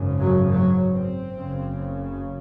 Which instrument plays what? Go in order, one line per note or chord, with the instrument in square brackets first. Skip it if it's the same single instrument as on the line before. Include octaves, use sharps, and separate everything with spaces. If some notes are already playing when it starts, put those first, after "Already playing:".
Already playing: [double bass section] G#1 F#2 C#3
F#3
F#3
C4
F#1 F#2 C#3